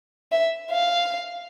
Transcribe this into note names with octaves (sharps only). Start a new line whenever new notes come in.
E5
F5